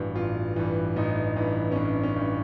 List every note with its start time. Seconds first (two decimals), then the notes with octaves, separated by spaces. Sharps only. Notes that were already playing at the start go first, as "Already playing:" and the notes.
Already playing: A1 G2 E3 F#4
0.15 A1 F4
0.56 G2 E3
0.96 A1 D#4
1.36 G2 E3
1.72 C#4
1.76 A1 D4
2.03 C#4
2.16 G2 E3